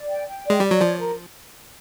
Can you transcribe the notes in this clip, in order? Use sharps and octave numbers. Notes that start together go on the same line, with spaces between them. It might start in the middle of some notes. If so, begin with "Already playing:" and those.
Already playing: D5
G5
G5
G#3 D5
G3 D5
F#3
F3 C#5
A#4